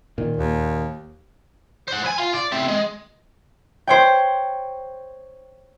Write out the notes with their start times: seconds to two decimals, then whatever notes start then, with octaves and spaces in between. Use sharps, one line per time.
0.18 A#2 D#3
0.37 D#2
1.88 C5 F#5
2.04 E4 G#5
2.18 F4 F5
2.34 D5
2.52 A3 C4
2.68 G#3
3.87 C5 C#5 G5